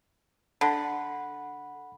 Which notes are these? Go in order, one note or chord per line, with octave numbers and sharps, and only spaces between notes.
D3 F#5 B5